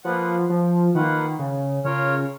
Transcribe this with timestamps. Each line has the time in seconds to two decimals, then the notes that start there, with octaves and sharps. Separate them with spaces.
0.04 F3 A#3 F4 B4 F#5
0.49 F3
0.95 D#3 A#3 F4 B4 F#5
1.39 C#3
1.84 C#3 F4 A#4 C#5